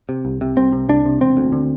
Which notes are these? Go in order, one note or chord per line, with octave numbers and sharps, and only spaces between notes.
C3
C2
C3
C2 C4
C3
C2 D4
C3
E1 C4
D2
D3